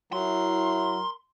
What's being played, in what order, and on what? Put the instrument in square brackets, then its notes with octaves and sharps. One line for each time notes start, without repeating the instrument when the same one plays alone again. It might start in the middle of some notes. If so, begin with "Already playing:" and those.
[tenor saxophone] F#3 [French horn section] E4 [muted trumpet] A#4 [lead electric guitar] C6